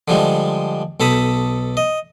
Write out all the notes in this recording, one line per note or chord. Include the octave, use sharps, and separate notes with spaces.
D3 F3 G3 G#3
B1 A4 A5 B5 D#6
D#5